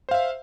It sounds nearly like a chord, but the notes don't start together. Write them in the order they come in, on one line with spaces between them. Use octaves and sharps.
C5 F5 E5